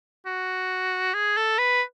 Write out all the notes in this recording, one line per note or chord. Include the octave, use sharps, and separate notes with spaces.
F#4
G#4
A4
B4